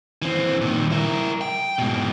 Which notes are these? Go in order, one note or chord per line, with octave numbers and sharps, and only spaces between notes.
E3 C4
A#2 D#3
E4 A#4
G5
G#2 B2